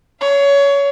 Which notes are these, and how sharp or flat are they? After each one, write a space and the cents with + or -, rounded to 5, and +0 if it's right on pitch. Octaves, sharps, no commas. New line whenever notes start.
C#5 +20 F5 -20